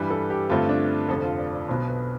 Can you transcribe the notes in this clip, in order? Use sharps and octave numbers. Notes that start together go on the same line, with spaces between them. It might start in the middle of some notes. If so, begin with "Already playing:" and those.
Already playing: G2 E3 G3 B4
A4
G4
G2 D3 A3 C4 F4
D4
F1 F2 D3 A4
F4
D5
D5
B1 B2 B3 C5
B4